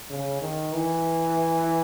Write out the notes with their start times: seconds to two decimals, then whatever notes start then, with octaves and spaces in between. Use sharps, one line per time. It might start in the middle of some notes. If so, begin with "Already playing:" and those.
0.10 C#3
0.42 D#3
0.73 E3